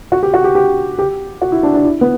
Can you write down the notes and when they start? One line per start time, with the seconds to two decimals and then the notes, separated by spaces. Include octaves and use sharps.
0.12 F#4
0.23 G4
0.34 F#4
0.44 G4
0.55 G4
0.99 G4
1.42 F#4
1.52 E4
1.63 D4
1.74 D4
1.84 E4
2.01 B3